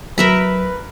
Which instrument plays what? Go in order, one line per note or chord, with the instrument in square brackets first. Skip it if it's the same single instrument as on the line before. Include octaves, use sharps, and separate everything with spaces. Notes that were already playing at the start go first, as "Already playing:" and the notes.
[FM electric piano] F#3 [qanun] A#4 E5 B5 [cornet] B4